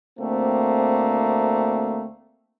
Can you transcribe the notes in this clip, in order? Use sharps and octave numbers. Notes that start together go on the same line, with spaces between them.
D2 A3 A#3 C4